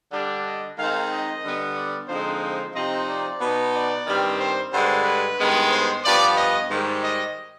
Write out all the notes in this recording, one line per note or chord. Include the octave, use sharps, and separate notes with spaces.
D3 G3 D4
D#5
D#3 G#3 C4 D#4 F5
D#5
D3 G3 B3
D5
D3 F3 G#3 C4 D#4 C5
C5
C3 F3 C4 D#4 D#5
D5
B2 B3 D#4
D5
G2 D#3 G3 C4
C5
G2 D3 G#3 C5
B4
G2 D#3 G#3 B3
C5
G2 F3 B3 D5
D#5
G#2 D#3 G3
D#5